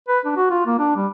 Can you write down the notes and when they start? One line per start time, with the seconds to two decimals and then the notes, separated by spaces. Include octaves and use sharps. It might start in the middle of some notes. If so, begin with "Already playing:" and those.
0.09 B4
0.25 D4
0.37 F#4
0.51 F4
0.66 A#3
0.79 D4
0.96 G3